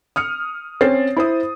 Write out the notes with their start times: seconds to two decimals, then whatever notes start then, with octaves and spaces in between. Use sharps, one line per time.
0.16 D#6 F6 C#7
0.81 C4 C#4 A6 C7
1.17 E4 C5 D#6